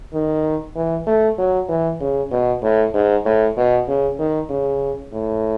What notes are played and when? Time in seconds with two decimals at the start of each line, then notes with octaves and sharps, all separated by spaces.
0.13 D#3
0.75 E3
1.06 A3
1.38 F#3
1.69 E3
2.00 C#3
2.31 B2
2.62 A2
2.94 G#2
3.25 A2
3.56 B2
3.88 C#3
4.19 D#3
4.49 C#3
5.12 A2